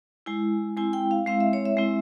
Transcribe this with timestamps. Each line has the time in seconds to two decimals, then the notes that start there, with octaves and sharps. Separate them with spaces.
0.26 G#3 E4 G#5
0.76 G#3 C4 E4 G#5
0.93 G5
1.11 F5
1.27 G#3 C4 E4 F5
1.40 E5
1.53 C#5
1.65 E5
1.77 G#3 C4 E4